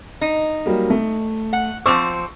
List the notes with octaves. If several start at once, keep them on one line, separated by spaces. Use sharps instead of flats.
D#4
F#3 G3 A#3
A3
F#5
F3 C4 C5 C#6 D6 E6